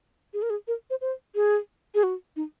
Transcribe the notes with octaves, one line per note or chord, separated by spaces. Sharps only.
G#4
A#4
G#4
A#4
C5
C5
G#4
G#4
F#4
D#4